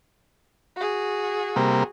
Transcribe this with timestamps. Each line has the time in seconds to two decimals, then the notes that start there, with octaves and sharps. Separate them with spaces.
0.76 F#4 G#4
1.56 C3 G3 A#3